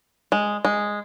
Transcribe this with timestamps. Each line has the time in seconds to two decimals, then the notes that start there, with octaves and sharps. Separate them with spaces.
0.32 G#3
0.65 G#3